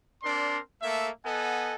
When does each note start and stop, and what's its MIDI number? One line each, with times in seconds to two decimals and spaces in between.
0.23 0.59 60
0.23 0.59 62
0.23 0.59 70
0.23 0.59 74
0.23 0.59 84
0.82 1.09 57
0.82 1.09 58
0.82 1.09 69
0.82 1.09 76
1.25 1.75 59
1.25 1.75 69
1.25 1.75 75
1.25 1.75 78
1.25 1.75 80